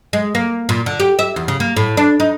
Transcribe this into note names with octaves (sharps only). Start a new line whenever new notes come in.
G#3
A#3
A#2
D3
G4
E5
E2
C#3
A#3
A2
D4
D#4